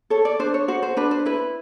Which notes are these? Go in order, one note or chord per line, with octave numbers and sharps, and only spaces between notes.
A4 C#5
D5
D4 C5
C#5
F#4 C5
C5
D4 B4
C5
E4 B4